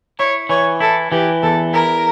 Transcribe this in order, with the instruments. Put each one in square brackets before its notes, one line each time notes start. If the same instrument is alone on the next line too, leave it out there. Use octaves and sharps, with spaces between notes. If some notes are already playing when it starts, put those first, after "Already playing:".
[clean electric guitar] E4 [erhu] C#5
[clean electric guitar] E3 [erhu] C#5
[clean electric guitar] E4 [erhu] A4
[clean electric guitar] E3 [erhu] G4
[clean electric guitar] E2 [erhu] A4
[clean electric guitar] E4 [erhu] A#4